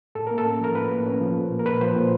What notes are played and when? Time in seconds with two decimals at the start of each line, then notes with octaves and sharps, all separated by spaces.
0.15 A2 A4
0.27 A#3 A#4
0.38 A4
0.45 C#4
0.60 F3 A#4
0.75 A2 B4
0.90 A#3
1.06 C#4
1.21 F3
1.36 A#2
1.51 A#3
1.59 A#4
1.65 A#2 B4
1.81 F3 C5
1.96 A#2